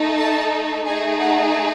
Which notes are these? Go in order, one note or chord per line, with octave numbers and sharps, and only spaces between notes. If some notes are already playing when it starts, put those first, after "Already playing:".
Already playing: A3 D#4 A4
A5
A3 D#4 G#4 G#5
F#5